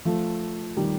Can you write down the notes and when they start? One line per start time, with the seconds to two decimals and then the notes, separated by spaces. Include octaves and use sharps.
0.05 F3 A3
0.77 D#3 G3